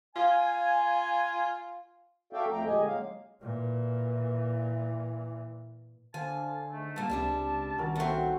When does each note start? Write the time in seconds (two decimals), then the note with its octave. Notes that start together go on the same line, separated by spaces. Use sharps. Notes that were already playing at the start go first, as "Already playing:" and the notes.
0.16 F4 F5 G#5
2.33 F#4 A4 D5 E5 F5 G5
2.51 F2 F3 A3 G5 A#5
2.66 A#2 D3 G#3 G4 D#5 G#5
2.86 F#3 G#3 A#3 F5
3.41 A#2 E3
6.14 D3 C5 F5 G#5 A5
6.71 G#2 A3
6.96 A#2 E3 G3 A#3 A5
7.10 C#2 C3 G3 D4 E4
7.78 C2 D#3 C#4 F#4 A#4
7.96 F#3 A3 B3 C4 F#5